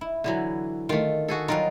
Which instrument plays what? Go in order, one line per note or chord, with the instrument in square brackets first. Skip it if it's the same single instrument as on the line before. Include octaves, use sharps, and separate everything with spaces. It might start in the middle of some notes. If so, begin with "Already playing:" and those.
[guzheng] E4
[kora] D3 E3 F#3
[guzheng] D#3 [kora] A3 F4
[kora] F#4 G#4 A4
[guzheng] F#3 G3 D#4 [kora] F4 A#4